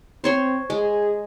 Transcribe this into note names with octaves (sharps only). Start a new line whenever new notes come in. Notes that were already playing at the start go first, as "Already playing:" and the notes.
C4 C5 C#5 C6
G#3 G#4